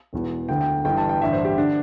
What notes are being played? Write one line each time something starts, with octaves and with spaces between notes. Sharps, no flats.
E1 E2 E3
D2 D3 G5
G5
G1 G2 E3 G5
A5
G5
A1 G2 D3 E5
C5
G4
D3 D4